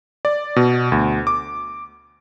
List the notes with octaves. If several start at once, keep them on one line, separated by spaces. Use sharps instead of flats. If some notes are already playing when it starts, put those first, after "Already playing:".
D5
B2
D2
D6